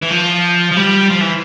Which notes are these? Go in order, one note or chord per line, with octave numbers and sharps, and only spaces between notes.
E3
F3
F3
G3
F3
E3